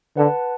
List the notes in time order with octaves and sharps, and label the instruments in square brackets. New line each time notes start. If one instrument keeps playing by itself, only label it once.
[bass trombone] D3 [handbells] B4 F#5 A5